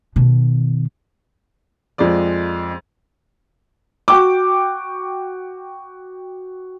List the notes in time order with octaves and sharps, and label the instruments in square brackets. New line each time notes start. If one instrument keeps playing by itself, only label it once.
[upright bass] B2 D#3
[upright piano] F2 F3 G#3 D5
[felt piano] F#4 G5 D6